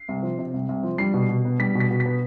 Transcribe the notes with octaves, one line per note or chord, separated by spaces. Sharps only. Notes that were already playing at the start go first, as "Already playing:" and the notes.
Already playing: C7
C2
F3
C3
C2
C2
F3
G3 C7
B2
B2
B3
G3 B6
B2
B6
B2
B6
B3